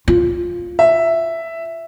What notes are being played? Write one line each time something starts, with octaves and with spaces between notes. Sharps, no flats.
F4
E5